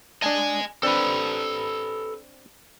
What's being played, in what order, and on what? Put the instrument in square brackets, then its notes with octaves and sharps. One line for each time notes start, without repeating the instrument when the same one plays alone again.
[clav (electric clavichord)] D4 A5 [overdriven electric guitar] D#5 G#5
[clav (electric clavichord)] C4 D4 [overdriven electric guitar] A4 B4